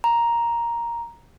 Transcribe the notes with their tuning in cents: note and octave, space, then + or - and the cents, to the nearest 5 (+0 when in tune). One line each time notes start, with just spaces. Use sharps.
A#5 +5